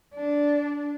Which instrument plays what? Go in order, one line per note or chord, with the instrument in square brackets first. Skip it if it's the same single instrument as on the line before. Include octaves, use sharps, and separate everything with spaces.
[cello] D4